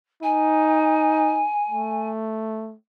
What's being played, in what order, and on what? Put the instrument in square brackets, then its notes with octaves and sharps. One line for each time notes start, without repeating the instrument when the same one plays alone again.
[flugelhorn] D#4 [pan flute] G#5
[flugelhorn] A3